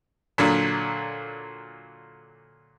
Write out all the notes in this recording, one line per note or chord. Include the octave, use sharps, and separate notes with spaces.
A#2 D3 F#3